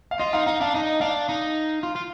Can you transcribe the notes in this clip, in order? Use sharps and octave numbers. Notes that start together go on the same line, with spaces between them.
F5
F4 D#5
D#4 F5
D#4 F5
D4 F5
D#4 D#5
D4 F5
D#4
F4
F4